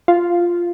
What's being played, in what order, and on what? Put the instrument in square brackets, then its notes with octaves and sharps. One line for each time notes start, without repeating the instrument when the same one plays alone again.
[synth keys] F4